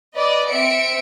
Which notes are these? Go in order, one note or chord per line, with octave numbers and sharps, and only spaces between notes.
B4 D5 D#5
C4 E5 C#7 D7